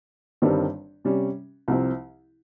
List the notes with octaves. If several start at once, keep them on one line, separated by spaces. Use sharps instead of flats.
G1 G2 D#3 G3 C4
C3 G3 C#4
C2 C3 F3 C4